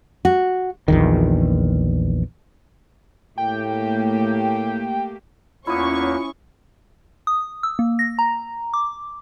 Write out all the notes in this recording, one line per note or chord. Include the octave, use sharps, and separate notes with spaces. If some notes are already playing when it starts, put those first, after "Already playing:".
F#4
A#1 E2 D#3
A2 A3 A#3 G4 G5
E2 A#3 B3 C#4 E4 F4 C#6 D#6
D#6
E6
A#3
A#6
A#5
D6